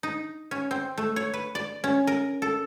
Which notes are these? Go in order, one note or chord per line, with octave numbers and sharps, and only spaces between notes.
D#4
C#4
C4
A3
C#5
B4
D5
C#4
A#4
A4